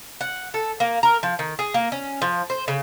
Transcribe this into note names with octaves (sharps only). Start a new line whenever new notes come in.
F#5
A4
A#3
A#4
F3
D#3
G#4
A#3
C#4
F3
C5
C#3